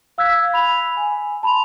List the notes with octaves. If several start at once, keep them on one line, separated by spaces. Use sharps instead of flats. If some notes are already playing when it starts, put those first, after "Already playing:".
F5 E6 F#6 G#6 B6
B5 F7
G#5
A5 B5 C6 F7